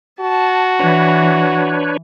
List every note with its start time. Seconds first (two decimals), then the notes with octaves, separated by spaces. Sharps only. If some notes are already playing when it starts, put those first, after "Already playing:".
0.20 F#4 A5
0.79 E3 D4 B4 C#5